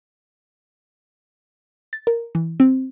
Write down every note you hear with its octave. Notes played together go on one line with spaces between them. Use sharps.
A6
A#4
E3
C4